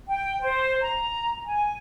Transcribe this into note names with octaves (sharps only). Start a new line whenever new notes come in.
G5
C5
A#5
G#5